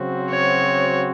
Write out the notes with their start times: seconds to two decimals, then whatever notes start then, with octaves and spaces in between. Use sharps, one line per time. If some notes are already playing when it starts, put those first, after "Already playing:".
Already playing: C#3 F#3 C4 F#4 C5
0.31 C#5